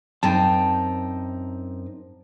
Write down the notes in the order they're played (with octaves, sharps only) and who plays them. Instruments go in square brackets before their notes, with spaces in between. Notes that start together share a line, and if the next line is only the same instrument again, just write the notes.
[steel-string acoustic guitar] F#2 C4 D#4 [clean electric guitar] G5 A5